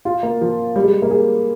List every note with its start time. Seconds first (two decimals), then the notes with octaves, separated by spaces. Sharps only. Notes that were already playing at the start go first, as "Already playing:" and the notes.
0.05 F4
0.23 A#3
0.41 F3
0.76 G3
0.84 G#3
1.02 A#3
1.11 G#4